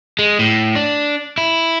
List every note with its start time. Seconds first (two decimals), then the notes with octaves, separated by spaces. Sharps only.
0.19 G#3
0.39 A2
0.75 D4
1.38 E4